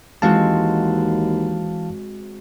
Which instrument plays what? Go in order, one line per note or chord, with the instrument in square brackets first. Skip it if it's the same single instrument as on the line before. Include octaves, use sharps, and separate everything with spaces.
[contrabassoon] D#2 [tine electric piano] E3 F5 A5 [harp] G#3 C4 F#4